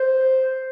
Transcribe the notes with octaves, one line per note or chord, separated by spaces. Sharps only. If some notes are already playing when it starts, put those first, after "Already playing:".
Already playing: C5